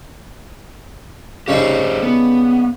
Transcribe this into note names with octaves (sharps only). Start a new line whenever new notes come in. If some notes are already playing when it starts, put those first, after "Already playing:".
C#3 G3 D#4 G4 A4 C5
B3